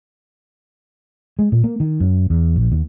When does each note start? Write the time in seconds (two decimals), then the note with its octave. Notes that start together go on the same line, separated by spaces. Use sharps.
1.39 G#3
1.52 A#2
1.64 A#3
1.80 D#3
2.00 F#2
2.30 E2
2.56 A#1
2.72 D#2